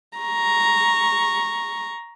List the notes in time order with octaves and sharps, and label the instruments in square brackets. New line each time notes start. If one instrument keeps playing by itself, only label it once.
[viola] A#5 C#6